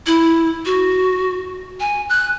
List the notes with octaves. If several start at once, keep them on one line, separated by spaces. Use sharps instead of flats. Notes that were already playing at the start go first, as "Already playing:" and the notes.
E4
F#4
G#5
F#6